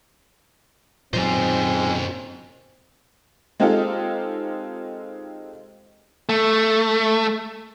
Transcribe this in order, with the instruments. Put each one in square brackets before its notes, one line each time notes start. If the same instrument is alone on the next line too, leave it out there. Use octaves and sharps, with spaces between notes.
[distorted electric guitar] F#2 C5 [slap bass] A#2 F#3 [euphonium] C4 [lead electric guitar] D#4 G#4
[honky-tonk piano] G#3 C4 D#4 F4 G4 A4
[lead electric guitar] A3